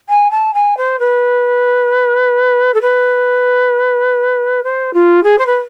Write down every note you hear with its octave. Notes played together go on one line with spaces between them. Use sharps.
G#5
A5
G#5
C5
B4
A4
B4
C5
F4
G#4
C5
B4